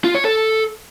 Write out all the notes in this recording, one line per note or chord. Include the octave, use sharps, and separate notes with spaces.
F4
C#5
A4